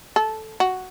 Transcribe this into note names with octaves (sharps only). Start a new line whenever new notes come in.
A4
F#4